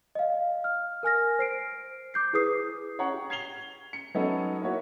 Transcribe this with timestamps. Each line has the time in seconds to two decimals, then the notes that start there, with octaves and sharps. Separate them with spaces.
0.15 D#5 F5
0.64 F6
1.03 A#4 G#5 F6 A#6
1.39 C5 C7 D7
2.14 D6 G6 C7
2.33 E4 G#4 B4 D#6 C7
2.99 C#5 F#5 A#5 C#6
3.14 G4
3.30 G#6 C7 F7 G7
3.93 C#7
4.15 F#3 B3 C#4 D#4 A4
4.62 A#3 E4 F#4 C#5